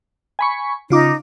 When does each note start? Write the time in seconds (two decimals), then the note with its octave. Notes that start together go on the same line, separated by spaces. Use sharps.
0.39 G#5 B5 C#6
0.90 C#3 D#4 F4 D6